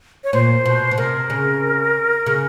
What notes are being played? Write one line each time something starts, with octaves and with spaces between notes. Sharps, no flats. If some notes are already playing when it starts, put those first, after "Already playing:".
C#5
A#2 C5
B2
B2
C3 A#4
C#3
C#3